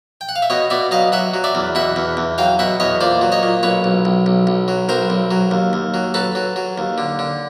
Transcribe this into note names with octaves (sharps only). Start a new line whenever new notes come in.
G5
F#5
F5
E5
B2 C#5 D#5
B2 D5 E5
F#3 D#5 F5
F#3 E5 F#5
F#3
D5 E5
E2
B2 E5 F#5
E2
E2
F#3 F5 G5
B2 E5 F#5
E2 C#5 D#5
A#2 C5 D5
F#3
C#5 D#5
A#2
B1 B4 C#5
B1
B1
B1
B1
F#3
B1 A#4 C5
B1
F#3
D#2
D#2
F#3
F#3 A4 B4
F#3
F#3
D#2
D3
D3